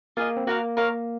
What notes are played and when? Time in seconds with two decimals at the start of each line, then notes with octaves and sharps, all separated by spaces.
0.17 A#3 F4 G#4 D#5
0.37 C4
0.47 A#3 F#4 A#4 F5
0.77 A#4 C#5 F5